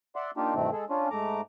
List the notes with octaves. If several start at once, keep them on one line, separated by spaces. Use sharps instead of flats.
D5 E5 F#5 C6
A#3 D4 D#4 F4 G4
G2 B2 D#3 E3 A3 C4
G#3 G#4 A4
C#4 D4 F4
G#2 A3 A#5 D6